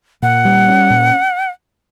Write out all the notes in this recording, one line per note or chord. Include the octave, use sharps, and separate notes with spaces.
A#2 F#5
G3
C#4
A#2